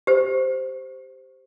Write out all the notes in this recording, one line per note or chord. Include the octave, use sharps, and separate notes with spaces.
G4 C5